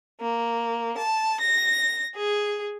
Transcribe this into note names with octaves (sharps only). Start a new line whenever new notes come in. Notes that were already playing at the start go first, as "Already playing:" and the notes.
A#3
A5
A#6
G#4